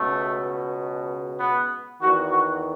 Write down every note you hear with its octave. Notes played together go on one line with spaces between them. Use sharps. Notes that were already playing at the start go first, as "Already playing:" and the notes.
Already playing: C#2 B2 A3
B3
E2 D#3 F#4
F#4